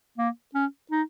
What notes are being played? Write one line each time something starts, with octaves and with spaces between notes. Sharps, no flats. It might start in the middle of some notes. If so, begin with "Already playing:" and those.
A#3
C#4
D#4